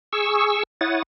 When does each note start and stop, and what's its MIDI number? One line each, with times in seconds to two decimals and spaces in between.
0.13 0.63 68
0.13 0.63 85
0.13 0.63 88
0.81 1.02 64
0.81 1.02 73
0.81 1.02 78
0.81 1.02 87
0.81 1.02 93